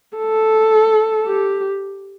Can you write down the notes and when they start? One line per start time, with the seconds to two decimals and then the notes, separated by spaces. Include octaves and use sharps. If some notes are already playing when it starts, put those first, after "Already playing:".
0.18 A4
1.26 G4